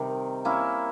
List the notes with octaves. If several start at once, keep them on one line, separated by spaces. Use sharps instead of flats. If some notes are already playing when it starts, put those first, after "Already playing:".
Already playing: C3 D#3 G3
A#3 C#4 E4